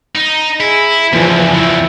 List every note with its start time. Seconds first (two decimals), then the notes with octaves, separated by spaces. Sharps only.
0.15 D#4
0.60 E4 G#4
1.13 E2 C#3 E3 F3
1.54 E2 A2 E4